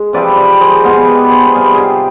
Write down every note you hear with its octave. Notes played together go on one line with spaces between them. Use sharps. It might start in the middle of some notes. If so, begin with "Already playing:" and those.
Already playing: G#3
C3 F3 C4 B4 D5
B4 D5
G#4 C5
B2 G#3 B3 F4 G#4
G4 B4
G#4 C5
B4
C3 G3 B3 F4 G#4
D#4 G4 G#4